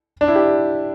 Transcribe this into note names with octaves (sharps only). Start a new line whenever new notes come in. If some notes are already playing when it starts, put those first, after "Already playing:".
D4
E4
G4